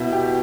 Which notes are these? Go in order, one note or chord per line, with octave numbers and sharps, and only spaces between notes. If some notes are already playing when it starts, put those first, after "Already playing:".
Already playing: B2 E4
G4